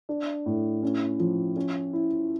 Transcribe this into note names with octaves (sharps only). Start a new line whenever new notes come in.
D4
A2
C#4
F3
C#4
E4